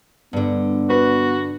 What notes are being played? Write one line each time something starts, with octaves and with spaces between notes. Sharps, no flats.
G2 D3 B3
F#4 B4